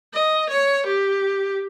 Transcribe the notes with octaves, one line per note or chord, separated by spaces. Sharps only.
D#5
C#5
G4